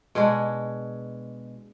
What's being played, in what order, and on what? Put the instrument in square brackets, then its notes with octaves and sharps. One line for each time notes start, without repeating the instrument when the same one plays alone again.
[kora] B2 G#3 D4 G#4